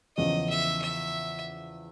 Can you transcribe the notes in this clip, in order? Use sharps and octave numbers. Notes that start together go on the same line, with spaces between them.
E2 C#3 F3 D#5
E5
E5